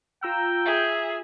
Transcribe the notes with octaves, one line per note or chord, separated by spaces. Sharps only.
F4 G5 A#5 E6
G#4 E5